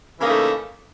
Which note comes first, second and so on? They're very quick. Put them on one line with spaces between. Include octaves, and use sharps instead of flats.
E3 C#3 A#3 D#4 A3